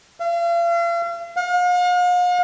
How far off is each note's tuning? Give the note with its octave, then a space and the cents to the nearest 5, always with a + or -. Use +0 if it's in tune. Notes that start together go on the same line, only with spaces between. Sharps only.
F5 -40
F5 +45